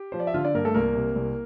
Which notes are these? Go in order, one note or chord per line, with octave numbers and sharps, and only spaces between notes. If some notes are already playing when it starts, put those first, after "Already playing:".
Already playing: G4
F3 C5
D5
E5
D3 F4 F5
D4 D5
G2 A#3 A#4
A3 A4
C2 A#3 A#4
C3
C2